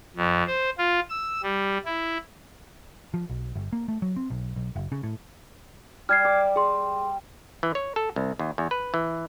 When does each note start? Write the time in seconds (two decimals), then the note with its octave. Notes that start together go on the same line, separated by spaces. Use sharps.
0.17 F2
0.47 C5
0.78 F4
1.10 E6
1.43 G3
1.85 E4
3.14 F3
3.30 B1
3.56 G1
3.73 A#3
3.88 A3
4.02 F#3
4.16 C4
4.30 B1
4.56 B1
4.76 F#1
4.92 C#3
5.03 A2
6.09 G3 F6 G#6 C7
6.25 D6
6.56 G#4 C6
7.63 E3
7.75 C#5
7.96 A4
8.16 C2
8.39 D#2
8.58 E2
8.71 B4
8.94 E3